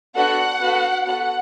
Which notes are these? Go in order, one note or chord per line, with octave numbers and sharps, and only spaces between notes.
B3 D4 F#4 A4 F#5
B3 F#4 A4
B3 F#4 A4 F#5